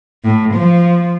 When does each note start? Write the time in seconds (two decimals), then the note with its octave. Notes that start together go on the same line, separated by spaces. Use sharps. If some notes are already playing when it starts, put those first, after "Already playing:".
0.24 A2
0.55 F3